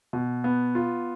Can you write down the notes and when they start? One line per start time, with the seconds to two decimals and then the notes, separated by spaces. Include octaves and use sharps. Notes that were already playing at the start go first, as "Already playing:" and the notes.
0.13 B2
0.44 B3
0.75 F4